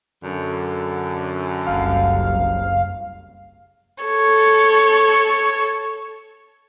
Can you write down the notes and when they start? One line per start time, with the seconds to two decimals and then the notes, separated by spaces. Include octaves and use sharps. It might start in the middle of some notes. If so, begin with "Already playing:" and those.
0.24 F#2 D3
1.67 F#1 C2 F5
4.05 A4 C#5